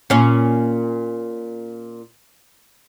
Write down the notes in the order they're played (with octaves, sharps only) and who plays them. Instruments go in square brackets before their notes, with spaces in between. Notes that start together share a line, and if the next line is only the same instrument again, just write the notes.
[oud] A#2 C#4